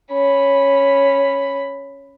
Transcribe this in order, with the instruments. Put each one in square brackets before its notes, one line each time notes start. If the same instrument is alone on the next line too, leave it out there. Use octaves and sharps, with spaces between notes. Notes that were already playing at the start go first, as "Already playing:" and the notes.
[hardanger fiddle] C#4 B5